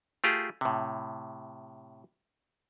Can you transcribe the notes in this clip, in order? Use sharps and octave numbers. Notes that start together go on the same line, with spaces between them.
A3 F4 G4 G#4
A2 C3